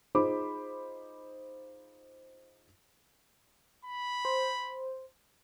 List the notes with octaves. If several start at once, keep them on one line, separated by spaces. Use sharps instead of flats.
D#4 F4 G#4 C5 B5 D6
B5
C5